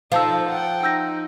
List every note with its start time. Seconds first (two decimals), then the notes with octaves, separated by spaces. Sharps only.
0.12 F3 D#4 A4 F5 A5 E6
0.49 F#5 G5
0.83 D#4 E6 G6 A#6